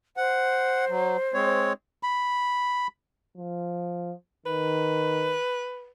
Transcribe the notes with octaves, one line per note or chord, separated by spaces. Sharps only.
C5 F#5
F#3
G#3 C4 C#5
B5
F3
D#3 B4